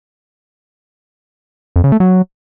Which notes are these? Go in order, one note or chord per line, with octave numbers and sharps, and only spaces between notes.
F2
C#3
A3
F#3